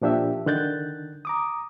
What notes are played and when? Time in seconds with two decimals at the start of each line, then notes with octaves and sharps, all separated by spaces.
0.02 A#2 F3 D4 G4 E5
0.46 D3 D#3 F#6 G6 A6
1.25 A#5 D6 D#6